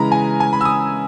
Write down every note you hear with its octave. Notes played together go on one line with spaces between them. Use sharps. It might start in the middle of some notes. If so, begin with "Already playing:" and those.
Already playing: C#3 E3 G#3 A#5 B5
G#5
G#5
B5
E6
D#6